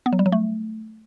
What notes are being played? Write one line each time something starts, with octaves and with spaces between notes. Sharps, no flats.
B3
F#3
G3
F#3
A3